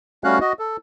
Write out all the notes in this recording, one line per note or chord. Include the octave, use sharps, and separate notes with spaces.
G3 A3 C#4 F#4 F5 F#6
F#4 D#5
A4